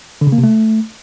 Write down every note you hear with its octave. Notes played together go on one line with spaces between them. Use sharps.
D3
C#3
A#3
C3
A3